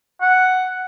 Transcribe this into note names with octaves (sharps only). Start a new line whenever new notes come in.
F#5